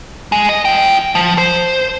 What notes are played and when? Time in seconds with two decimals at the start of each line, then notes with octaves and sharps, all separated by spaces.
0.32 G#3
0.49 D#5
0.65 F4 G5
1.15 F3
1.38 C5